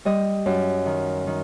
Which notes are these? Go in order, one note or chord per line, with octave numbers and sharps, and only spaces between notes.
G3 D#5
F#2
D#3
D#3